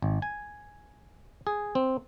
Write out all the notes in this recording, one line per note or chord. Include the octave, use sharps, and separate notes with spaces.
G#1
G#5
G#4
C4